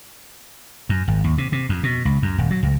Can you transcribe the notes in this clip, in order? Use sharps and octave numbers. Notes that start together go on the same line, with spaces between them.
F#2
G#1
D#2
C3
C3
F2
B2
C#2
F#2
D#1
F#3
C#2